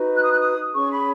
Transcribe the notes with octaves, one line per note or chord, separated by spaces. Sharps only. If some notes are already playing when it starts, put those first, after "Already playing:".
Already playing: D#4 F#4 B4
F#6
D#6
F#6
D#6
C#4 G#4 C#5 C#6
B5